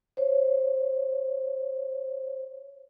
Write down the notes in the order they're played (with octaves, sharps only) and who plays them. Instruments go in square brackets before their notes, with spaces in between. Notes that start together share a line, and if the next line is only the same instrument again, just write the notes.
[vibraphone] C5 C#5